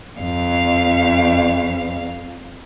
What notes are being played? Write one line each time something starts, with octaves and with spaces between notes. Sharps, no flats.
F2 F5